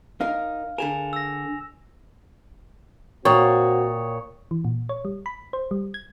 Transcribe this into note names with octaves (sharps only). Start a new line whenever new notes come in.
D#4 A#4 F5
D3 G#4 A#4 G#5 E7 F7
E6 A#6
A#2 C4 F#4 C#5 G5 D#6
E3
A#2
C#5
G3
B5
C5
G3
G#6